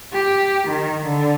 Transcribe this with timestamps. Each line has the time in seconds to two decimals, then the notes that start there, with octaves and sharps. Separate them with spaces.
0.12 G4
0.68 D#3
1.05 D3